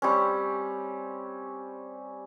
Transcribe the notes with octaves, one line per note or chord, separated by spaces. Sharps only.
G3 C4 C#4